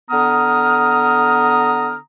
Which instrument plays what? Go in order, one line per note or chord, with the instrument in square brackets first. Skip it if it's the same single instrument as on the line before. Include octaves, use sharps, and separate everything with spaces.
[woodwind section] D3 B3 A#5 D#6 F6